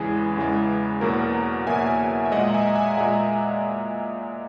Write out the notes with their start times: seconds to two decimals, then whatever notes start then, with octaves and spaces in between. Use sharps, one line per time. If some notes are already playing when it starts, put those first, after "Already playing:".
Already playing: E2 C#3 E3 G#3 G#4
0.36 E2 C#3 E3 G#3
1.01 E2 B2 F#3 A#3 F#4 A#4
1.67 E2 B2 F#3 A#3 E5 G#5
2.26 E5
2.32 A#2 G#3 D#5 F#5
2.49 A#5
2.54 E5 G#5
2.75 E5 G#5
2.97 A#2 G#3 F#5 A#5